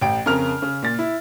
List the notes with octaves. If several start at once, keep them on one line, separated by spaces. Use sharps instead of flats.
A1 G5 D7
F2 C#3 A#4 F6 F7
C#3
A#2 A6
E4